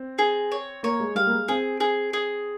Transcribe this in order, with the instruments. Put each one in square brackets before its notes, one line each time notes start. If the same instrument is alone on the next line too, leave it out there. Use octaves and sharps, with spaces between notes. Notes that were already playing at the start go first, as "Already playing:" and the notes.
Already playing: [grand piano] C4
[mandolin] G#4
C#5
[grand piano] A#3 [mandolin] C#5
[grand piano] G#3
[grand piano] G3 [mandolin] F5
[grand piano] A#3
G#3
[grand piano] C4 [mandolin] G#4
[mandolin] G#4
G#4